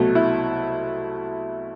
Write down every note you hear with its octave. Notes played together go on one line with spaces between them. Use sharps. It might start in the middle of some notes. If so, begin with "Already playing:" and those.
Already playing: C2 B2 F#3 A3
E4